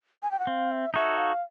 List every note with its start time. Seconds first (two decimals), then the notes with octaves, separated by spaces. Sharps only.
0.23 G#5
0.31 G5
0.39 F#5
0.47 C4 F5
0.71 E5
0.94 D#4 F#4 A4 C#5 E5
1.17 F5